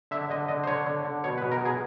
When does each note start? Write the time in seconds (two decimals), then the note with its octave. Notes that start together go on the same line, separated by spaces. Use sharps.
0.11 D3 E5
0.30 D3 D#5
0.48 D3 D#5
0.64 C5
0.67 D3 C#5
0.86 D3
1.04 D3
1.24 B2 C#5
1.38 B4
1.42 B2
1.52 A#4
1.61 B2 G#4